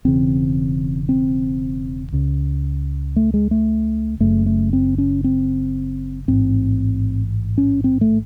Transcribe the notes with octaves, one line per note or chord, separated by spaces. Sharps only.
E1 E2 C#3 C4
C4
C#2 C#3
A3
G#3
A3
F#1 F#2 C#3 A3
A3
C4
C#4
C4
A1 G#2 C4
C#4
C4
A3